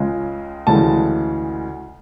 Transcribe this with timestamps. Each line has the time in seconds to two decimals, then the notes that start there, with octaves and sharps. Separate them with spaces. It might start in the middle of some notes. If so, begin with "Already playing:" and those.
Already playing: C#2 C#3 G#3
0.67 D2 C#3 E3 G#3 A5